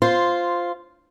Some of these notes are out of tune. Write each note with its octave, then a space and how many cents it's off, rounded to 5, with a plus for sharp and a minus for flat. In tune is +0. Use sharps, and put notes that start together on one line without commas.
F4 +0 C5 -5